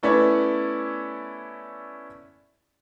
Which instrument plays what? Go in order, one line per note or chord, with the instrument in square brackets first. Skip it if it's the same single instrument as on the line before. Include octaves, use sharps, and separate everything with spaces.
[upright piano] A3 B3 C#4 E4 C#5 D5